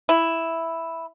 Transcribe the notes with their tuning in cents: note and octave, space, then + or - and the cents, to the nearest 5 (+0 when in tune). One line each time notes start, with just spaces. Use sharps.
E4 +0